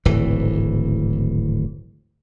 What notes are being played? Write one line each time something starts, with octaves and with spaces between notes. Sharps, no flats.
D1 G#1 E3